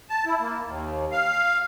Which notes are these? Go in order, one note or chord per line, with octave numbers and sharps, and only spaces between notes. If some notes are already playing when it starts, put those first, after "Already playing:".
A5
E4
A#3
D#2
F5